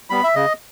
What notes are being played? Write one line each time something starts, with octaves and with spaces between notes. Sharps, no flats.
G3 B3 B5
E5
C#3 D#5